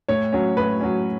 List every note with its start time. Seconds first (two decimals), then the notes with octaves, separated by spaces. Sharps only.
0.08 A2 C#5
0.33 F#3 C#4
0.56 A2 B4
0.81 F#3 C#4